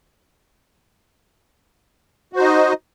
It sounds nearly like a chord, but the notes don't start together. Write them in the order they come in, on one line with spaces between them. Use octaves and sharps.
F#4 C5 D#4 D#5